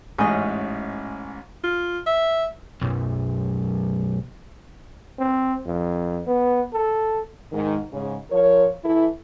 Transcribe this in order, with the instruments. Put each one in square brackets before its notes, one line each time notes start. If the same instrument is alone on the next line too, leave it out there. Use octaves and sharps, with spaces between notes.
[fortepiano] A1 G#2 G#4 [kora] C#4 D#5
[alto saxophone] F4
E5
[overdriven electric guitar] B1 F#2
[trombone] C4
F2
B3
A4
[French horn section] G#2 D#3
G#2 C#3
F3 A#4 C#5
E3 E4 A4